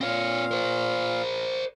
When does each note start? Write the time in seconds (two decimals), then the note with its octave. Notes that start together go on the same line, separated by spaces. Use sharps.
0.01 A#2 C4 C#5 F5
0.51 A#4 C5